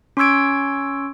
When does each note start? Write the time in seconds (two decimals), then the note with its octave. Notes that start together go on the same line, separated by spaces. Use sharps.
0.17 C#4 C6 C#6 E6 G#6 D7